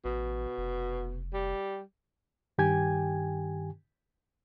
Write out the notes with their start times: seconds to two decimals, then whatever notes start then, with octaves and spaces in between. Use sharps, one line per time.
0.05 A1 B2
0.58 F1
1.33 G3
2.58 G2 D#3 G4 G5 G#5 G#6